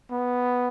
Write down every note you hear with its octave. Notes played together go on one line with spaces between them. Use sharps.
B3